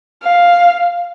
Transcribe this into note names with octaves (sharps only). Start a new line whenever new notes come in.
F5